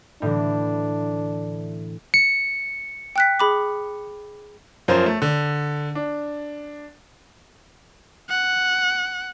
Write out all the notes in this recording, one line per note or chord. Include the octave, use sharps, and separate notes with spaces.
A2 D3 E3 D4
C#7
G5 F#6 B6
G#4 B5 D6
F#2 F3 A#4 C5
A3
D3
D4
F#5